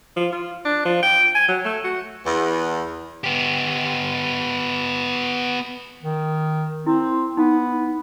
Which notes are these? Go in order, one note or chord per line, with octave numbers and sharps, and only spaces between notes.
F3
F4
D4
F3
G5
G#5
F#3
A3
F#4
E2
B3 G4
D#3
C4 E4
B3 D#4